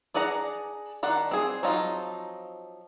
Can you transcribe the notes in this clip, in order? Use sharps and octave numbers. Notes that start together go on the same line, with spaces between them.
D4 G#4 D5 F#5 A#5
D#3 D4 F#5
C4 G#4
F3 F#3 C4 D#4 F4